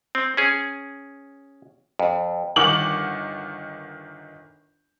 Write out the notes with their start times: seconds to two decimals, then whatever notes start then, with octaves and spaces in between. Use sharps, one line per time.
0.15 C4
0.37 C#4 G#4
1.99 F2
2.56 G1 D#3 F#5 D6 F#7